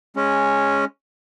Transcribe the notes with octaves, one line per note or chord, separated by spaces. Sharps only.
G#3 C#4